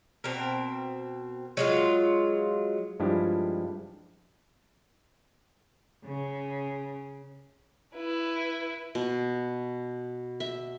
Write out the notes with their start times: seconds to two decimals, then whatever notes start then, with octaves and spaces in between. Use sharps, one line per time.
0.24 B2 C4 A#4
1.57 F#3 G#3 F4
3.00 G2 F3 G#3 D4 E4 G4
6.05 C#3
7.96 E4 B4
8.95 B2
10.40 E5